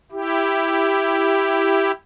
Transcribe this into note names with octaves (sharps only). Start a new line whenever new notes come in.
E4 G4